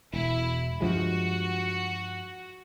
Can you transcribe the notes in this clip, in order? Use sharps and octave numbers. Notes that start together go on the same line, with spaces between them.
E1 E4
G2 F3 G#3 F#4